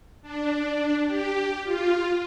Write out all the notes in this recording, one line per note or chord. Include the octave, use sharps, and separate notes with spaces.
D4
G4
F4